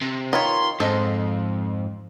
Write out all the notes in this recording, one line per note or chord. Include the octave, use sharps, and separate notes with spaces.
C3
D#3 F4 B4 C#5 C6
F2 G#2 A4 C5 D#5